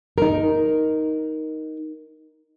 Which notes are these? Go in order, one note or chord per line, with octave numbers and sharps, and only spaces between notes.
D#4 A#4